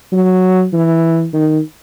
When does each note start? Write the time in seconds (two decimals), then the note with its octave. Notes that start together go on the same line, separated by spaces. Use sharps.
0.12 F#3
0.73 E3
1.33 D#3